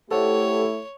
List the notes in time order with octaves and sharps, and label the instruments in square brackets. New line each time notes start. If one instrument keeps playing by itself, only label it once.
[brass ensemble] A3 E4 [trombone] G4 [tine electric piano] A4 C5 F#5 [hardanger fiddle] C#5